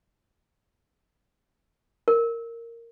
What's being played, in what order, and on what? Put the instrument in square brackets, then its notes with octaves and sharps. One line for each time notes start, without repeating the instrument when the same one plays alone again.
[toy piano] A#4